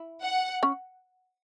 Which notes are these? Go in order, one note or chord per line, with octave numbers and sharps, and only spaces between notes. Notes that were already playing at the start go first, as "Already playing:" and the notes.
Already playing: E4
F#5
C#4